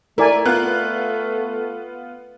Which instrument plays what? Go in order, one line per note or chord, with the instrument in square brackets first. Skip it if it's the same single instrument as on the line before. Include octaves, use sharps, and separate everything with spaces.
[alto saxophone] A3 [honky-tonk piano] E4 [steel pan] A#4 D5 G#5
[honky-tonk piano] B3 F4 F#6